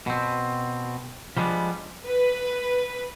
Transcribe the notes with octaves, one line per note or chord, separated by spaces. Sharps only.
B2 C4
F3 G3 G#3 B3 D4
B4